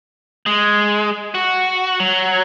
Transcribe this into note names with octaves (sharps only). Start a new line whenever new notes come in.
G#3
F#4
F#3